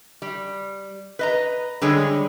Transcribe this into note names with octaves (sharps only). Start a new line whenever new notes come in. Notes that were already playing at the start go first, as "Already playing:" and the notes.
G3
B4 D#5 A#5
D3 G3 G#3 G#4 C#5